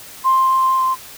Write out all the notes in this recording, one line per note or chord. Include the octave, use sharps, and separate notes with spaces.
C6